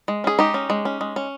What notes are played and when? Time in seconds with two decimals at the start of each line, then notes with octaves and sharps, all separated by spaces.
0.08 G#3
0.24 C#4 G#4
0.39 G#3 D#4 G4
0.54 C#4
0.70 G#3
0.85 C#4
1.01 G#3
1.16 C#4